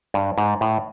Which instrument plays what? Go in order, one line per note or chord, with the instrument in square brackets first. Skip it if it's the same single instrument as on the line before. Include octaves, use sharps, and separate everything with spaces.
[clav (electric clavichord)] G2
G#2
A2